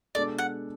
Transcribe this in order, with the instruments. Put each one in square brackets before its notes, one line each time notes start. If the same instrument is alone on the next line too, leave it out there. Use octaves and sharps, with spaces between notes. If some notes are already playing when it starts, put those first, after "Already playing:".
[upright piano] B2 G#3 D4 A4 [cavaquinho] D5
[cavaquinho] F#5